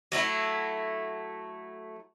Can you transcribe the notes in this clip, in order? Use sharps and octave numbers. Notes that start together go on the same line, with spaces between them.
F#3 A3 D#4 E4